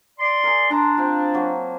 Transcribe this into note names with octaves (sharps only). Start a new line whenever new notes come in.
D5 C6
G#4 A#4
D4 A#5 C6
C4 F4
F#3 A#3 A5